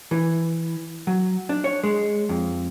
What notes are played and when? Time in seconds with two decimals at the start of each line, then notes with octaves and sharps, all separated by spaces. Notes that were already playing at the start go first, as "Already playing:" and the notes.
0.11 E3
1.07 F#3
1.49 D4
1.64 C#5
1.83 G#3
2.29 F2